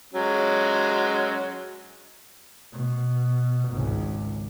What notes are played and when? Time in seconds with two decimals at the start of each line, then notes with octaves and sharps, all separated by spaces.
0.13 F#3 G#3 C#4
2.72 B2
3.70 G#1 C#2